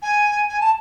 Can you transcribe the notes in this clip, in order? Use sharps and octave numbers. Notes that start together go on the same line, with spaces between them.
G#5
G#5
A5